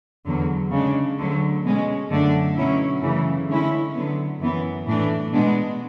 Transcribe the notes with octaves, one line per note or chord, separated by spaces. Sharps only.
E2 D3 F#3
C#3 G#3 D4
D2 D3 F#3
B2 G#3 C#4
F#2 D3 A3 D4
B2 F#3 C#4 E4
F#2 C#3 E3 A3
D3 G#3 C#4 E4
D3 F#3 B3
F#2 E3 B3
A2 E3 A3 D4
B2 G#3 B3 D4